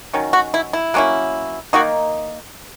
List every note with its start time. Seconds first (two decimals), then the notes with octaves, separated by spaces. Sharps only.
0.13 D#3 F#3 C#4
0.33 F#4
0.54 E4
0.73 E4
0.94 F#3 A#3 C#4 E4
1.73 D#3 A#3 D#4 F#4